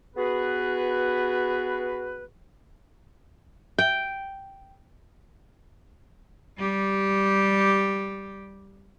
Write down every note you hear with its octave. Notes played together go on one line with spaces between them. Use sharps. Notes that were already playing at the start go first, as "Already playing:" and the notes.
B3 F#4 G#4 B4
G5
G3 G4